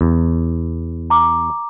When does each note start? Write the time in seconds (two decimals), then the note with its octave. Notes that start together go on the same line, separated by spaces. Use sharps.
0.01 E2
1.10 A#5 D6